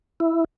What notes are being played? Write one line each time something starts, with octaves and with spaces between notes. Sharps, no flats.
E4